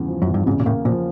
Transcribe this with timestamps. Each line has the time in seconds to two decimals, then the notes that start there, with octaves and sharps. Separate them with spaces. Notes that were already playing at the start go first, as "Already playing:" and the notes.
Already playing: E2 G2 C#3
0.08 F3
0.22 F#2
0.28 E2
0.34 G2
0.46 G#2 C#3
0.60 A#2
0.66 A2 A#3
0.85 A#2 F3